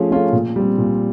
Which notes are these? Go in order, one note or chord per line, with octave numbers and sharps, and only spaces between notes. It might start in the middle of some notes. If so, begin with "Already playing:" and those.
Already playing: F3 A3 C#4 F4 G#4
A3 C#4 F4 G#4
A#2
G3 C4
A#2